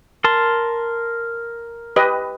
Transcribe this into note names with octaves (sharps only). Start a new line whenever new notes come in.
A#4 A5 C6
G4 B4 D#5